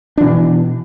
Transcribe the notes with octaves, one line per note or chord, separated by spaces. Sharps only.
B2 E3 D4